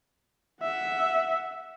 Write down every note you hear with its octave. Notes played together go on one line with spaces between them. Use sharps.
E5 F#5